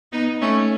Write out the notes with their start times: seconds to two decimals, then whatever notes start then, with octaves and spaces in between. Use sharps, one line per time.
0.12 B3 D#4
0.41 A3 C#4